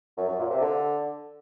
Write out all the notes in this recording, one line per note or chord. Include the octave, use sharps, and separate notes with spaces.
F#2
F#2
A#2
C3
D3